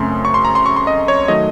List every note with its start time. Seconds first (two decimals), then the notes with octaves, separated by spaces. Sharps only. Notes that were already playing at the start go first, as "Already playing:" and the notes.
Already playing: F#2 C#3 A3 C4 C6
0.25 C#6
0.34 C6
0.45 A#5
0.55 C6
0.66 C#6
0.76 C6
0.87 D#5
1.08 C#5
1.28 D#3 F#3 A3 D#5